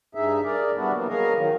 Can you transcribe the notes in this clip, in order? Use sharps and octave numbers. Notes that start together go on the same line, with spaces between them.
G2 D#4 G#4 E5
G#4 A#4 D5
G3 B3 D4 E4 F#4
E3 F#3 G3 A#3 B3
G#4 A#4 C#5 D#5 F5
D#3 F#3